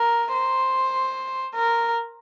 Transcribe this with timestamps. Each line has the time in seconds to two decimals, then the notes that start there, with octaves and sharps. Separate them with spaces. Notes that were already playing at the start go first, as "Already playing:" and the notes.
Already playing: A#4
0.34 C5
1.56 A#4